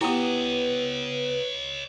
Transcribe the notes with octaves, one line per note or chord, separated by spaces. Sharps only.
B3 E4 G4 B4 C#5 D#5 D#6